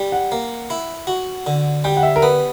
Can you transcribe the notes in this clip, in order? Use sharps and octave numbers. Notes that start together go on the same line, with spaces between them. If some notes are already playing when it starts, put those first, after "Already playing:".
Already playing: G3
F#5
A#3
E4
F#4
D3
G3 G5
F#5
E5
A#4
B3 B4